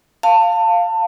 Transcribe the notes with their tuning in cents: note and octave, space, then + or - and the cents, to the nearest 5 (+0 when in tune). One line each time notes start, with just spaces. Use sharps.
F5 +0 A5 +25